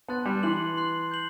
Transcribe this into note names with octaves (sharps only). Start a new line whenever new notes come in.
B3 A5 C6 F#6 A6
G3
E3 C6 F#6 C7 F#7
C6 F#6 C7 F#7
G6 C7 F#7